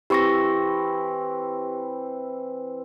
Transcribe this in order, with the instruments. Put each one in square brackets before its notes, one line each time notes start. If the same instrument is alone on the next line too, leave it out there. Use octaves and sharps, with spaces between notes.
[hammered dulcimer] E3 C4 E4 [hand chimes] G4 C#6 A#6